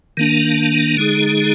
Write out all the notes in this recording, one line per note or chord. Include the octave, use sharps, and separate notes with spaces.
D#3 A#3 D4
D3 G#3 D#4 G#4